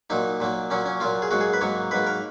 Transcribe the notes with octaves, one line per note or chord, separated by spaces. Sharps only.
A#2 F#3 A#3 D#4
A#2 F#3 A#3
A#2 F#3 A#3 C#4
C#4
A#2 F#3 A#3 F4
G#4
G#2 F#3 A#3 F#4
G#4
B4
G#2 F#3 A#3 C#5
G#2 F#3 A#3 B4
A#4